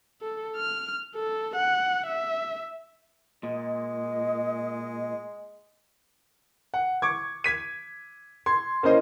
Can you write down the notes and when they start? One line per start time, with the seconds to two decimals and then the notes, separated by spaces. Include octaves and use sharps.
0.22 A4
0.56 F6
1.15 A4
1.56 F#5
2.07 E5
3.43 A#2 G#3 D#5
6.74 F#5
7.02 C#6 D6 G#6
7.44 G#6 B6 D#7
8.46 C6 G#6
8.83 A#3 C#4 E4 C5 D#5